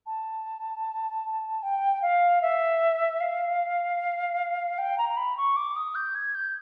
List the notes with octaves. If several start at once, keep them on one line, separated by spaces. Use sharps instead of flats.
A5
G5
F5
E5
F5
G5
A#5
A#5
B5
C#6
D6
D#6
G6
G#6
G6